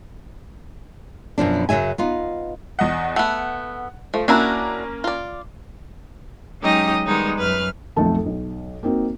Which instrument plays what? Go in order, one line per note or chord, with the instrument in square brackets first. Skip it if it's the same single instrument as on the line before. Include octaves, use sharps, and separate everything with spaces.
[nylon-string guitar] F#2 B2 F3 D4
F#2 C#3 F#3 E5 G#5
B3 D#4 F4
[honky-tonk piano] E2 D#5 F#5
[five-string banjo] A3 B3 [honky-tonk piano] F#5
[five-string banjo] F3 [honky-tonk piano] A3
[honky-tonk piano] A#3 C#4 A#5 [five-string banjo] D4 E4 F#4
[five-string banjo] F4 D5
[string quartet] F#3 G#3 C#4 D#4 G4 D#5
D#3 G3 G#3 B3 D#4
F#2 B4 F6
[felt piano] B1 F2 A3 A4 A5
B1
A#3 C4 D#4 F#4